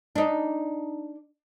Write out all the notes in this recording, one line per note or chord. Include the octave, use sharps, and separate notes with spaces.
D4 D#4